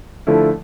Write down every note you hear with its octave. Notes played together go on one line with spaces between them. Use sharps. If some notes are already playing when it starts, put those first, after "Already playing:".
D3 F3 A3 E4